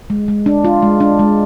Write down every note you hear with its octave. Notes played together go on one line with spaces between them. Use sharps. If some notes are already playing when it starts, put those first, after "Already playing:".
G#3
G#3
D4
F4
G#3
D4
G#3